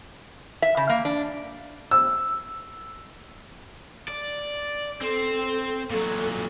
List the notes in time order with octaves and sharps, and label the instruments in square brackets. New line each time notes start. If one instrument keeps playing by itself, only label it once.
[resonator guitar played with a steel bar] E5
C#3
A#3
D4
[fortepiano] E6
[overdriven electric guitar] D5
[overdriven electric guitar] C4 C5 [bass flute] A4
[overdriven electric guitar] A#2 F#3 [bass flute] A4